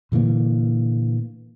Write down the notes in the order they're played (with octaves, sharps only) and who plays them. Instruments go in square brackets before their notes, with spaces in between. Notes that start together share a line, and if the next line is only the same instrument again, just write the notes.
[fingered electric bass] A#2 D3 E3 A#3